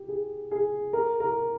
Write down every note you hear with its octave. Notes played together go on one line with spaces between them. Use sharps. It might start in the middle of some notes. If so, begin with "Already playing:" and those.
Already playing: G4
G#4
G#4
A#4
A#4